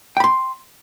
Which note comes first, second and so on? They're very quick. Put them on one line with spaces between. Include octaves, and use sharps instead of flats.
G5 B5 C6